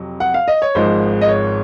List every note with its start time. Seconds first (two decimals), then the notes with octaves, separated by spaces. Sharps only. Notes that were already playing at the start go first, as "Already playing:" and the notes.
Already playing: F2 C3 F#3
0.20 F#5
0.34 F5
0.48 D#5
0.62 C#5
0.75 G#1 G#2 F3 G#3 C5
1.21 D#5
1.28 C#5